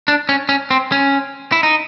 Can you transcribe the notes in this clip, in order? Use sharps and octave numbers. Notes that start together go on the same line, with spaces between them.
D4
C#4
C#4
C4
C#4
E4
D#4